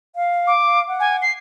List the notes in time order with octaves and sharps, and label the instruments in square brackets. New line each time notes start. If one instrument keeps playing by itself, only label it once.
[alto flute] F5
[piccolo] D6
[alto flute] F5
F#5
[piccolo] G#5
C7